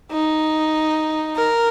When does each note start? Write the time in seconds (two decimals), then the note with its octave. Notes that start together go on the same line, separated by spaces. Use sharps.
0.11 D#4
1.36 A#4